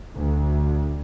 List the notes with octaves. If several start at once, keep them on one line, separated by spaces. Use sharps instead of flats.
D2